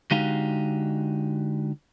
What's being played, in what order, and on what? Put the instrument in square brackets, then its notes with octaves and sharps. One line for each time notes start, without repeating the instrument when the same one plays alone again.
[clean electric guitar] D3 G#3 D#4 F#4 G4 F5